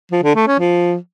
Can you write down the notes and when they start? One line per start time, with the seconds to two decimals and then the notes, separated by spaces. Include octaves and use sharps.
0.12 F3
0.24 D3
0.35 A3
0.47 C#4
0.59 F3